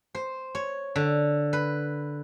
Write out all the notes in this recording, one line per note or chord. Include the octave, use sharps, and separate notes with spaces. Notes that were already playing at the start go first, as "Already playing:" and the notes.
C5
C#5
D3
B4